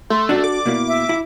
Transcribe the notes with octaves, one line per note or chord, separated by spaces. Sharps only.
A3 C6
D4 F#4 A4 D5
D6
B2 A#3 E4
E5
E4